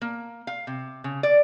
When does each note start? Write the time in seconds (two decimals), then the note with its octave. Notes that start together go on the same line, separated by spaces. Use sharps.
0.02 A#3
0.47 F5
0.67 C3
1.04 C#3
1.23 D5